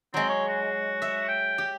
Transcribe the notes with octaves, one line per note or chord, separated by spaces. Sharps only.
F#3 G#3 C4
C#5
F#4
E5
G5
G4